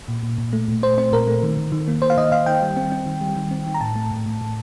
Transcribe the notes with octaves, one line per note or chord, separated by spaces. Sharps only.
A#2
A#2
A#2
A3
A#2
A3 C5
C4 C5
A#2 A#4
A3
D#3
D#3
D#3
A#3
D#3 C5
F5
D#3 D#5
D#3 F5
D#3 G5
G3
C4
C4
D#3
G3
D#3
C4
D#3
A#5
A2 A5
A3
A2
A2
A2